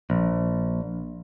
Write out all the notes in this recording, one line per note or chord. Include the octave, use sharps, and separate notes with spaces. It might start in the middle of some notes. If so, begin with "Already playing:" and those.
A#1